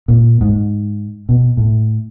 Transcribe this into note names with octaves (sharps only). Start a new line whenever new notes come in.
A#2
G#2
B2
A2